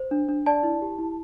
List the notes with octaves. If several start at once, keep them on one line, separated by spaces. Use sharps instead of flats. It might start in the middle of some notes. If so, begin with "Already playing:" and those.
Already playing: C5
D4
D4
D5 A5
E4
G4
E4